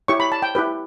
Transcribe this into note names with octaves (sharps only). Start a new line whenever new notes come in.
E4 G4 C#5 C#6
B5
A5
G5
E4 G4 B4